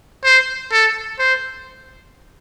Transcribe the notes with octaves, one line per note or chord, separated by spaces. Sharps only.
C5
A4
C5